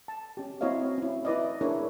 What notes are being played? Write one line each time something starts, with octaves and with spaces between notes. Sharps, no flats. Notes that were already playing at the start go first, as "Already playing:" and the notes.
A5
C#4 G4
C4 E4 F#4 C#5 D#5 F5
C#4 E4
E4 B4 D5 D#5
D4 E4 G#4 A#4 C#5